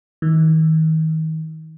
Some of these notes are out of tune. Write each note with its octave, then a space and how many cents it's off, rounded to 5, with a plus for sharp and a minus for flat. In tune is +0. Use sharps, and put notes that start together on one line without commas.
D#3 +35